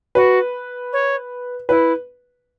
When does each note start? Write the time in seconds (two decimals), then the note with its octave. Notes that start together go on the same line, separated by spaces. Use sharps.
0.15 F#4 B4
0.92 C#5
1.69 E4 B4